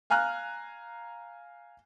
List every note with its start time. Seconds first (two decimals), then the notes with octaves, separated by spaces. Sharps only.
0.10 F5 G#5 A#5 F6 F#6